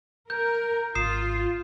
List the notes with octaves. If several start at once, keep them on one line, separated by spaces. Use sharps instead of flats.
A#4 G6
G#1 F4 D#6 C7 E7